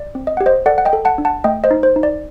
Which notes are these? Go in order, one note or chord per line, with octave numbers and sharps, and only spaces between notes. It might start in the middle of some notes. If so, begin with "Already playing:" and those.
Already playing: D5
C4
D#5
G4 F#5
C5 D#5
A4 D5 F#5
F#5
D#5 G5
A4
F#5 A5
D4
F#5 A5
A3 D#5 G5
C5 D#5
D#4
C5
D#4
D5